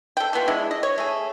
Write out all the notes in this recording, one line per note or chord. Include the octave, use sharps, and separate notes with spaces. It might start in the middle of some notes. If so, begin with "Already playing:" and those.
A4 G5
E3 A3 B3 F4
G#3 D4 E4
D#5
C#5
A3 G#4